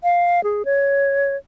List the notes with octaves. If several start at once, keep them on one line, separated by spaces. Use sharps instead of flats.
F5
G#4
C#5